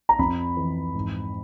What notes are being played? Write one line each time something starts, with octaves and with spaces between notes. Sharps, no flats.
A#5
F2 B5
E3
G#2